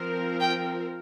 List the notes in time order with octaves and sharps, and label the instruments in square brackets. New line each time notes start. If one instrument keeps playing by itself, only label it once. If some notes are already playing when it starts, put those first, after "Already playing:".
Already playing: [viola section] F3 C4 A#4
[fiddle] G5